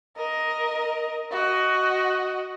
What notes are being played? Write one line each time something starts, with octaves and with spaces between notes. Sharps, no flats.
A#4 D#5
F#4 D#5